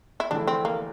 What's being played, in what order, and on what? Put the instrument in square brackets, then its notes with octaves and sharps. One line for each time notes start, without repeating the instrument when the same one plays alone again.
[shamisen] E4
[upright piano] F1 E2 D3 A3 E4 [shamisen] D4
[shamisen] C4
A#3